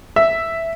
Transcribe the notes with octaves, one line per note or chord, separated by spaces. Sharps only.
E5